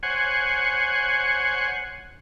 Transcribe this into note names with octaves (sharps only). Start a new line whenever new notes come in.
C5 C#5 F#5 G#5